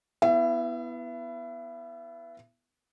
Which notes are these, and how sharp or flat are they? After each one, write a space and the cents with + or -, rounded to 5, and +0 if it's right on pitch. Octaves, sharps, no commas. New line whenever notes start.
B3 +0 E4 +0 E5 +35